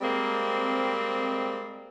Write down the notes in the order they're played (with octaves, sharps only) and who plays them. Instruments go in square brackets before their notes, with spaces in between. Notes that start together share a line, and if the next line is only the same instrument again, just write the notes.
[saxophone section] G3 G#3 A#3 C4